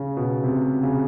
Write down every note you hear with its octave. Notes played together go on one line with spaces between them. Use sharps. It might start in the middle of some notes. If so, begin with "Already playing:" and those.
Already playing: C#3
B2
C3
C#3